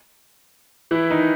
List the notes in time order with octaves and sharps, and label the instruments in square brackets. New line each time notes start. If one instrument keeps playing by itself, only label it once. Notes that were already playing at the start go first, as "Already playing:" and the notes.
[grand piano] E3 E4
D#3 D#4